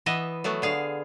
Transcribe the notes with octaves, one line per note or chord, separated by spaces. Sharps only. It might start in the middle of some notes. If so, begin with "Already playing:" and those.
E3 B3 D#5 E5
F#3 A3 B3
D3 G#4 F5